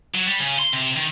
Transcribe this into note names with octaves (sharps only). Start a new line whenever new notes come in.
F#3
G3
C#3
C6
C3
D#3